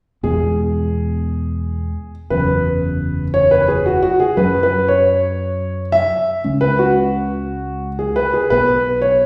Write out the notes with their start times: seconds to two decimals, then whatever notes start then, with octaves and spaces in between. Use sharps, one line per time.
0.23 E2 B2 G#3 G#4
2.30 F#1 E2 C#3 F#3 B4
3.34 C#5
3.51 B4
3.68 G#4
3.86 F#4
4.03 F#4
4.20 G#4
4.37 F#2 F#3 C#4 B4
4.63 B4
4.88 C#5
5.92 E5
6.44 C#2 C#3 G#3 C#4
6.61 B4
6.79 F#4
7.99 G#4
8.16 B4
8.34 G#4
8.50 B1 B2 B3 B4
9.02 C#5